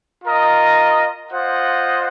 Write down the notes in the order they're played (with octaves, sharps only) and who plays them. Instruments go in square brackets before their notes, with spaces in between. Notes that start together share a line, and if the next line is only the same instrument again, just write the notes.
[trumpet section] F4 A#4 D#5
F4 C5 D#5 F#5